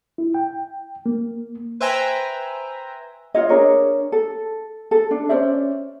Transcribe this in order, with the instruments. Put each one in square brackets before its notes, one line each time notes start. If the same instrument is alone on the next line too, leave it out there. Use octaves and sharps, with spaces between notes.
[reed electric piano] E4
G5
A#3
[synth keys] B4 C5 E5 G5 G#5 A#5
[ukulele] F4 C#5 D#5
D4 G#4 A#4 C#5
A4
A4
D4
C#4 C5 D5 E5